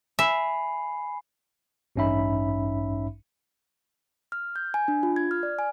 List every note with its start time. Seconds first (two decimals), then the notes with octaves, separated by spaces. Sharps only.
0.19 E5 G#5 B5 C7
1.96 A1 G2 C#4 D#4 E5 B5
4.32 F6
4.56 G6
4.74 G#5
4.88 D4
5.03 F4
5.16 G#6
5.31 F6
5.43 D5
5.59 G#5